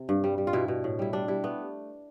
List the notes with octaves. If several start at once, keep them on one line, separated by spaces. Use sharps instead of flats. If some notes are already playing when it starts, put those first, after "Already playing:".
Already playing: C3
G2
G3
G3
F4
B2 E4
B2
A2
G3 E4
G3 D4
G3 E4
A3 B3